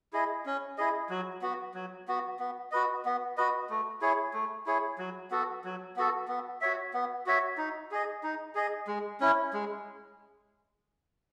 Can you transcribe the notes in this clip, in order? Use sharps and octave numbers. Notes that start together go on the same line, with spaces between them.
E4 G#4 D#5
C#4
E4 G#4 D#5
F#3
B3 F#4
F#3
B3 F#4
B3
F#4 B4 D#5
B3
F#4 B4 D#5
A3
E4 G#4 C#5
A3
E4 G#4 C#5
F#3
B3 F#4 A4
F#3
B3 F#4 A4
B3
F#4 C#5 E5
B3
F#4 C#5 E5
D#4
G#4 D#5
D#4
G#4 D#5
G#3
C#4 E4
G#3